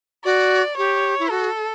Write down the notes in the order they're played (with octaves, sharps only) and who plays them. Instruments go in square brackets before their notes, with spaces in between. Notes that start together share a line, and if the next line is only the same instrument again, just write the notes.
[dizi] F#4 [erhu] D5
[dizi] G4 [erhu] C#5
[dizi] E4
[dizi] F#4 [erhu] A4